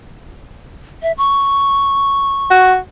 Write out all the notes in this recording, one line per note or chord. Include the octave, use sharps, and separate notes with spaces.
E5
C#6
F#4